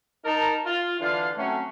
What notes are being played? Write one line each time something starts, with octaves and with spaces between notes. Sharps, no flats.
D#4 A#4 A5
F4
D3 E3 D4 F4 F5
F#3 A3 C4 C#4